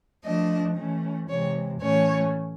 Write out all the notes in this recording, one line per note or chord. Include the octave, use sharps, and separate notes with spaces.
F3 A3 D4 D#5
E3 A3 C#4
C3 E3 G#3 C#5
A2 E3 A3 C#4 C#5